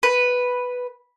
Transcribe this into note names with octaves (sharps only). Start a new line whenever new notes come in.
B4